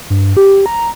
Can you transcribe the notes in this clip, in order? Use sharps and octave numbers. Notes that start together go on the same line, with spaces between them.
G2
G4
A#5